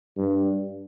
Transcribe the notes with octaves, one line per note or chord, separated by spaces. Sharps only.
G2